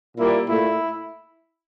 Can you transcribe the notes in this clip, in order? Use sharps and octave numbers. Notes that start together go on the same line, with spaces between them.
A#2 G3 A#3 E4
A#2 A3 E4